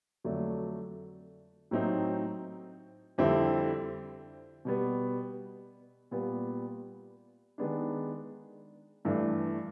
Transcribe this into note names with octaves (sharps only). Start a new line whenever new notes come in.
F2 D3 F#3 A3 D4
A2 F#3 A3 C4 D#4
F2 D3 G3 C4 E4
B2 G3 B3
A#2 G3 B3
D#3 G#3 B3 D4
G2 E3 A3 D4